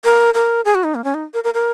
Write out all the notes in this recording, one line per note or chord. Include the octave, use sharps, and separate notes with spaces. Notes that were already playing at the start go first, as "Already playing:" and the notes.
A#4
A#4
G#4
F#4
D#4
A#3
C#4
D#4
A#4
A#4
A#4